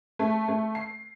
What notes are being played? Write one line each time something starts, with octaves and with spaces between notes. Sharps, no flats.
A3
A3
C7